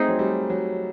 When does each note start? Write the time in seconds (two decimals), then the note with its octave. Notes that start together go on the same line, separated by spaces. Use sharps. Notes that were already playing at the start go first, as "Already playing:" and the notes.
Already playing: A3 C4 D#4 G#4
0.08 F#3
0.19 G3
0.50 F#3